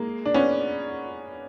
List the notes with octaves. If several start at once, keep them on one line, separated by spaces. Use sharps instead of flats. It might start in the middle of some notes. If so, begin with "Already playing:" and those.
Already playing: G#3 A#3
D4
B3 C#4